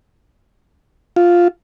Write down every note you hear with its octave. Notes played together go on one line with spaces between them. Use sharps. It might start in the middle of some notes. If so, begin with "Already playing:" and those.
F4